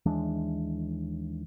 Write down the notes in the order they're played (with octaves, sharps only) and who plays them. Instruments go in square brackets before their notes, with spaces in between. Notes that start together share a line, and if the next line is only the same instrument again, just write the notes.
[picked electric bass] D#2 E3 G#3 D4